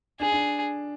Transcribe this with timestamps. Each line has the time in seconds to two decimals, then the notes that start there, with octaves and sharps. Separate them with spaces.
0.20 D4 G#4
0.32 D4